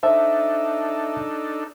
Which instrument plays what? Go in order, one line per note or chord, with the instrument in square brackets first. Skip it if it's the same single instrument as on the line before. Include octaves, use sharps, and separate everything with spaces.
[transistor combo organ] D4 D#4 A4 [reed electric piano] C5 E5 A5